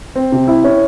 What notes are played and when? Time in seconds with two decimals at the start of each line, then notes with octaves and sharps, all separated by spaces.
0.16 C4
0.32 C3
0.48 E4
0.64 C#4